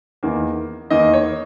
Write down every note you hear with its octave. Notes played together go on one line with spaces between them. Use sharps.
E2 D#3 A#3
E2 D#3 A#3 D#5
C#5